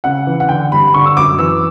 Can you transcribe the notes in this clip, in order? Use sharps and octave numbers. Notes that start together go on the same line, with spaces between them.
C#3 F#5
E3
F#5
D3 G5
G2 B5
D3 C#6
E6
F#2 D6
E3 E6